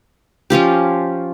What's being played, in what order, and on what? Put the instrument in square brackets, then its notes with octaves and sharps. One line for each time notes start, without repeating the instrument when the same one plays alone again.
[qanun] F3 C#4 F4 G4